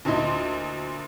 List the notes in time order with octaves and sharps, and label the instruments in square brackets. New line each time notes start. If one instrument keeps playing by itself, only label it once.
[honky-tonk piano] D2 A#2 E4 D#5 C6